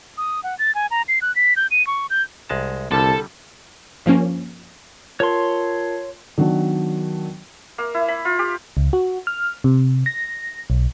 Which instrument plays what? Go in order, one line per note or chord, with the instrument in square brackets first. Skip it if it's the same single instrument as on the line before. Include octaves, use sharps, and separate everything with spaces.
[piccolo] D#6
F#5
A6
G#5
A#5
C7
F#6
B6
G6
D#7
C#6
G6
[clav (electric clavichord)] C2 G#3 A5
[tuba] C2 [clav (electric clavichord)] D3 G3 [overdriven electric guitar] A4 [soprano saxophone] A5
[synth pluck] G2 F3 A#3 C#4
[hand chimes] F4 A#4 A5 [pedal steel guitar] C#5 C6
[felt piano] D#3 F#3 B3 D4
[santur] A#3
E4
B5
F4
G4
[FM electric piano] C#2
F#4
F6
C3
A#6
B1